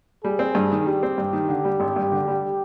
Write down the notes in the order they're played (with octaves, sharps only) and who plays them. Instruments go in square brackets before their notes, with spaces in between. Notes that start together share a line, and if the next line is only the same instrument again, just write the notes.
[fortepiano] G3 [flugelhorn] G#4
[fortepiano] C4
G2
D#3
[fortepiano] G3 [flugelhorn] G4
[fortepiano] C4
G2
D#3
D3
G3
G#1
G2
D3
G3